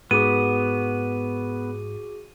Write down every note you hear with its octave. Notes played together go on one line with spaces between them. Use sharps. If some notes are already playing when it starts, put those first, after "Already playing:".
G#2 B3 F#4 G#4 D6 D#7